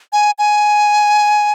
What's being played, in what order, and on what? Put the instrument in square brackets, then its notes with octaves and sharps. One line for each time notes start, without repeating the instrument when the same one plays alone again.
[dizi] G#5
G#5